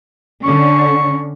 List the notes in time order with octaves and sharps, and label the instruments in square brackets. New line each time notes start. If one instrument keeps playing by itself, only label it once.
[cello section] D3 C#4 [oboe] C#6